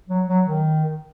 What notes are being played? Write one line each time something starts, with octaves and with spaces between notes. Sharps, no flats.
F#3
F#3
D#3